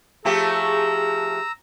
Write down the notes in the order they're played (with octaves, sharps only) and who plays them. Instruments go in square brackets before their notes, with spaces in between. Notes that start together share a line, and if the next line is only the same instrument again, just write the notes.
[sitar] F3 A3 G4 [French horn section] G#4 [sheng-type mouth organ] A#5 E6